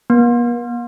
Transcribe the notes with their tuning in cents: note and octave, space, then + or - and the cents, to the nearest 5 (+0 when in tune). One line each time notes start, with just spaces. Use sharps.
A#3 +45